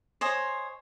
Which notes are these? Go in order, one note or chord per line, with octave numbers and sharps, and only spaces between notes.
C5 C#5 D#5 G#5